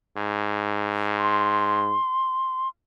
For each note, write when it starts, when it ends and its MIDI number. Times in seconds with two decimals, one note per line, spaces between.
0.17 1.95 44
1.19 2.68 84